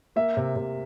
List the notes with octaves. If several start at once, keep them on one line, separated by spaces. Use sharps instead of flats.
A#3 E5
C3
C3